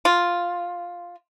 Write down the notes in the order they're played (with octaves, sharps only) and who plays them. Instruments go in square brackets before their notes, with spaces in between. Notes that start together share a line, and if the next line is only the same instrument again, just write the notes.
[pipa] F4